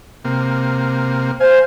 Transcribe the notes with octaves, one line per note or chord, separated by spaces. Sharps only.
C3 A#3
C5 F5 G#5